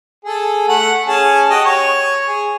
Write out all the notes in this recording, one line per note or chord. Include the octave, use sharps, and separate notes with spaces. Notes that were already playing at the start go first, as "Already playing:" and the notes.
G#4 A4
A3 F#5
C#4 G#4 A5
F#4 G4 D#5
C#5
G#4